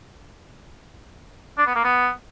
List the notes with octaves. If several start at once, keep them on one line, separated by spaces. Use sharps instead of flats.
D4
B3
A#3
B3